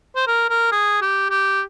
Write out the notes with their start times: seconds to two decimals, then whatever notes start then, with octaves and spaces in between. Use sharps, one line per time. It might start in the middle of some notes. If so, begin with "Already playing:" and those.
0.16 C5
0.27 A#4
0.49 A#4
0.72 G#4
1.02 G4
1.30 G4